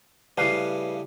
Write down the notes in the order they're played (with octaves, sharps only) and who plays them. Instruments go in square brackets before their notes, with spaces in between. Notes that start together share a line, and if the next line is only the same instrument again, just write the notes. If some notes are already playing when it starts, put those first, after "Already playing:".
[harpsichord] A2 C#3 G3 [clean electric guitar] B4 F5